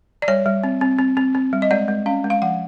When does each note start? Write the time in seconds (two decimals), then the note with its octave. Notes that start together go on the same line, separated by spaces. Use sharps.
0.22 D5
0.28 G3 C#5
0.46 G3
0.64 C4
0.81 C4
0.99 C4
1.17 C4
1.35 C4
1.53 G3
1.62 D#5
1.71 G#3 D5
1.88 G#3
2.06 C#4 F5
2.24 G#3
2.30 F5
2.42 F3 F#5